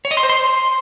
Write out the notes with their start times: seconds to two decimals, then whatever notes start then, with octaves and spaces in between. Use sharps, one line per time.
0.05 C#5
0.11 D#5
0.17 C6
0.23 C5
0.29 C6